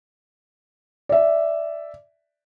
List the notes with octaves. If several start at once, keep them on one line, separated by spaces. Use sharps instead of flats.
D5 E5